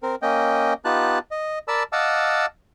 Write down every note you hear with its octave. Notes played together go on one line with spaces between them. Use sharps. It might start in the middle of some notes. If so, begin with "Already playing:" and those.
C4 A#4
A#3 C#4 D#5 G5
B3 D#4 F4 G4 A5 F#6
D#5
A#4 D5 A5 B5 E6
D#5 F5 F#5 A5 D6 E6